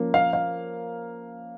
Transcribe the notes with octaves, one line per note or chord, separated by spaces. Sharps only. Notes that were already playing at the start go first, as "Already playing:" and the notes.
Already playing: F3 A#3 C#4
F5
F5